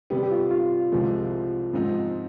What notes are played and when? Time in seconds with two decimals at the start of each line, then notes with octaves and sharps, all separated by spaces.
0.10 C3 G3 B3 G4
0.23 G4
0.32 F4
0.51 F4
0.92 C2 C3 F3 G#3
1.73 G#2 F3 C4 D#4